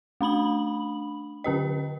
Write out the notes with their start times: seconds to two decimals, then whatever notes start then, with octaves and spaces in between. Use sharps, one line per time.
0.21 A3 D4 B5 F#7
1.44 D3 C#4 G4 D#5